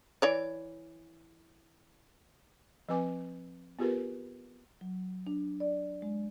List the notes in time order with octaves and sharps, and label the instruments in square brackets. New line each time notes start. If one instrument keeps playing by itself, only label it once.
[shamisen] E3 C#5 D5
[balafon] F3 C4 B4 G#5 D6
B3 F4 G4 G#4 A#4 B4
[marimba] F#3
D4
D5
G#3